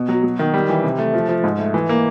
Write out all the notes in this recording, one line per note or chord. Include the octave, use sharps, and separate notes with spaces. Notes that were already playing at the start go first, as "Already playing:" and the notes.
Already playing: B2
F#3
F#3
D#3
G3
E3
C3
A3
F3
F3
G#2
A3
E3
A#3